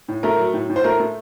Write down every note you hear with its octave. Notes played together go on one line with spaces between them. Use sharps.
A2
A3 A#4
F#3
A2
A2
C5
A3 A#4
A3